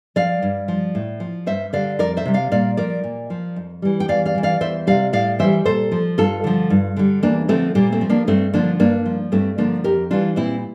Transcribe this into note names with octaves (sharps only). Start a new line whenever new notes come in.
F3 D5 F5
G2
F3
A2
F3
G2 C5 E5
D3 G3 D5 F5
F2 A#4 D5
C5 E5
C3 G3
D5 F5
A#2 D5 F5
F3 A#4 D5
A#2
F3
F2
E3 G3
G5
E2 D5 F5
D5 F5
E3 G3
D5 F5
E2 C5 E5
C3 G3 D5 F5
A2 D5 F5
E3 G3 C5 E5
A#2 A4 C5
F3
G2 F4 A4
D3 F3
G2
D3 G3
E2 A#3 D4
D3 F3 A3 C4
A#2 G3 A#3
A3 C4
F3
A#3 D4
G2 A3 C4
D3 F3 A#3 D4
G2 A#3 D4
F3
G2 A3 C4
D3 F3 A#3 D4
F2 G4 A#4
E3 G3 D4 F4
A#2 C4 E4